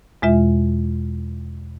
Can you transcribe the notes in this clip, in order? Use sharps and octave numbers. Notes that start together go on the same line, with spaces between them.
E2 B2 G#3 F4 E5